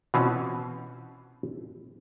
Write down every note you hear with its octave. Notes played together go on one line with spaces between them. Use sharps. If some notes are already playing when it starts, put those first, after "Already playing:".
B2 E3 C4 C#4 F4 F#4